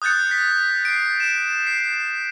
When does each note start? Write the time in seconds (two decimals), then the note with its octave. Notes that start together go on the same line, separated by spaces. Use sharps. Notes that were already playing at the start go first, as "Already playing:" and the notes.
0.02 D#6 F#6 G6 A6 C#7
0.31 B6
0.85 C7 D7
1.20 E7
1.67 C7